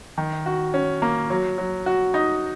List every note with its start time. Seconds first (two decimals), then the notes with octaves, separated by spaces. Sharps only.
0.18 D#3
0.46 F#4
0.74 C#4
1.02 A#3
1.30 F#3
1.58 F#3
1.86 F#4
2.14 D#4